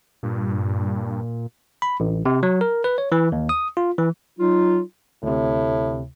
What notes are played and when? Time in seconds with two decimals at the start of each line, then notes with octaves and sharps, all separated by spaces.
0.23 G2 A#2
1.82 B5
2.00 A1
2.26 C3
2.43 F#3
2.61 A#4
2.84 B4
2.98 C#5
3.12 E3
3.32 D#2
3.49 D#6
3.77 F4
3.98 E3
4.39 F#3 D#4 F4
5.23 D2 A2 C3